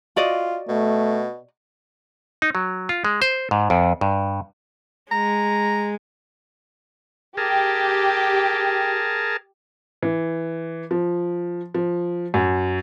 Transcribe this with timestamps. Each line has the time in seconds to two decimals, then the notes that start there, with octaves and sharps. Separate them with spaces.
0.16 F4 F#4 D5 D#5
0.69 B2 A3
2.42 D#4
2.55 F#3
2.89 F4
3.05 G#3
3.22 C5
3.51 G#2
3.70 F2
4.01 G2
5.12 G#3 A#5
7.37 G4 G#4 A#4 A5
10.03 E3
10.91 F3
11.74 F3
12.34 F#2